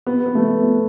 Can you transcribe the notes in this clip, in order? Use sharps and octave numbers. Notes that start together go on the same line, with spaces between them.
B3
B3
A3
B3